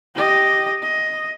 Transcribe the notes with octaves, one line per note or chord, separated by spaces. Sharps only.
G4 D#5
D#5